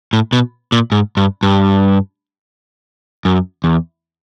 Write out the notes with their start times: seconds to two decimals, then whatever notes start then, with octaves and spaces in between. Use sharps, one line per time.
0.13 A2
0.33 B2
0.72 A#2
0.92 G#2
1.17 G2
1.43 G2
3.25 F#2
3.64 E2